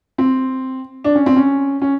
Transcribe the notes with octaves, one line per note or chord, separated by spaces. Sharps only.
C4
D4
C#4
C4
C#4
C#4